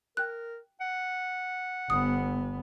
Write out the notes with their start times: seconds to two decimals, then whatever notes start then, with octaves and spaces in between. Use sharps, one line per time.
0.17 A#4 G5 F#6
0.80 F#5
1.90 G1 B3 D#6